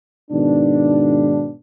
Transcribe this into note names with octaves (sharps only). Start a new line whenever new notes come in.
G#2 B2 D#3 B3 D4